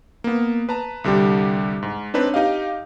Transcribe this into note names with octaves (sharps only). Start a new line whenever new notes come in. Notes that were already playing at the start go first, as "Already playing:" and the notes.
A#3 B3
B4 A5 A#5
C2 D3 G3 G4
G#2
C4 D4 D#4 B4 C#5
D#4 G4 D#5 F5